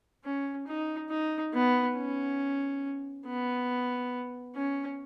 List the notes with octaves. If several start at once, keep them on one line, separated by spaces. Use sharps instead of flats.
C#4
D#4
D#4
B3
C#4
B3
C#4